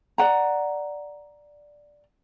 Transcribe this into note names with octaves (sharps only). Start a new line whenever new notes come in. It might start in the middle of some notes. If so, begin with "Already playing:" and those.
D5 F#5 A#5